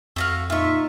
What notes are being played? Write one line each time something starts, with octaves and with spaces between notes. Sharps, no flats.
F2 A3 F#4 F5
A#2 D#4 F4 E5 C#6